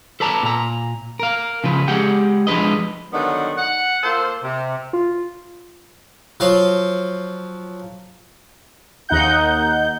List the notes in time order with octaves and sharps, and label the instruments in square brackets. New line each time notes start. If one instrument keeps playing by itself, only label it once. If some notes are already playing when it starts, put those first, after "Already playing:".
[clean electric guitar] A4 B4 D5 A5 A#5
A#2 A#5
A#4 F5
C#3 F3 B4
G#3 G4 G#4 F#5 G5
F3 G#3 D4 B4 D#5
[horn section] D3 D#3 F#3 G3 B3
F#5
A#3 F4 A4 C5
C3
[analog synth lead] F4
[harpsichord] F3 F#3 F5
[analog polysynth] D#2 D#4 F#5 G6